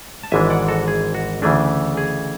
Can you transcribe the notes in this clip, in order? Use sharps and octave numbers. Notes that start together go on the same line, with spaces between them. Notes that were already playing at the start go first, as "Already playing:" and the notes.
A5
G#1 G#2 E3 G#3 D4 E5 G#5
D5 F#5
F#4 A4
G#4
F#4
D2 C#3 E3 A3 D4 G#4
G#4